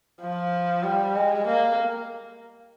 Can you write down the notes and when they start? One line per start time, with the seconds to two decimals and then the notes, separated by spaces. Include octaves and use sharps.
0.21 F3
0.84 G3
1.16 G#3
1.47 A#3